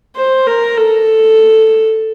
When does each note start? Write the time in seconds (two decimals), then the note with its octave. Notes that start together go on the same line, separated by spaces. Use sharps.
0.16 C5
0.47 A#4
0.77 A4